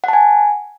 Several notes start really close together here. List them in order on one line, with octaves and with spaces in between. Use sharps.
F#5 A5 G#5